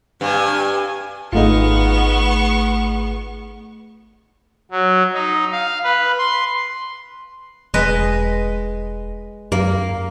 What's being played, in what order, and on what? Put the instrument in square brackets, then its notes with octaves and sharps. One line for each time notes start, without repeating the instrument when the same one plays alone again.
[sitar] G2 [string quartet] G#5
[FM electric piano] G#1 A3 G#4 [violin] B3 C#6 [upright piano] D#4 F4
[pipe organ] F#3
D#4
F5
B4
C6
[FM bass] E1 [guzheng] G#3 B4 D#5
[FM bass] F#2 [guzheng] A#3